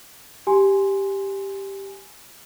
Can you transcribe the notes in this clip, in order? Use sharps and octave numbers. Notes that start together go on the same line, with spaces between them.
G4 G#5 C6